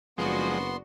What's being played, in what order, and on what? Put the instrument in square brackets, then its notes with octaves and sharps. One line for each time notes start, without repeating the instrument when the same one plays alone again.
[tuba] F#1 [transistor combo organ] F3 G#3 [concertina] B3 C6 [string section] D4 F#4